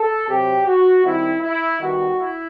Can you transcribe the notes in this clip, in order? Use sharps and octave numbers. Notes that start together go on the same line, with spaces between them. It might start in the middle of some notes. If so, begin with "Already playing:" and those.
Already playing: A4
C3 F#3 C4 G4
F#4
D#3 G3 C4 E4
E4
D#3 G3 B3 F#4
E4